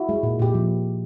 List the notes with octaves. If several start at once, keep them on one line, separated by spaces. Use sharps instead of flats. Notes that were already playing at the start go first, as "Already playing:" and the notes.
Already playing: E4 F#4
G#3
A#2
A#2 G4
F3